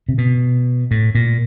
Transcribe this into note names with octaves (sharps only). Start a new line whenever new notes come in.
C3
B2
A2
A#2